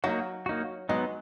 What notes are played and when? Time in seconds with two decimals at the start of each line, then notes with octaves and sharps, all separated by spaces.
0.04 F#3 A#3 D#4 F#4
0.46 A#3 D#4 F#4
0.89 F#3 G#3 B3 D#4